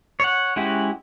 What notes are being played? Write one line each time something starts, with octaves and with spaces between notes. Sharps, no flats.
C#5 F#5
G#3 C#4 E4 F#4 G4